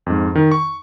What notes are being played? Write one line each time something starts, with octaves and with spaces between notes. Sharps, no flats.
F2 G#2
D#3
C#6